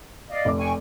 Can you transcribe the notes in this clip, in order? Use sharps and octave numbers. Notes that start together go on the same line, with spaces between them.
D5 D#5 F5
F1 D6
G5 G#5 C#6